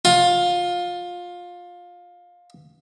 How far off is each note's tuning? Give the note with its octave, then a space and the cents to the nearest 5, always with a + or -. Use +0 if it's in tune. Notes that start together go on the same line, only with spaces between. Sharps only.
F4 +20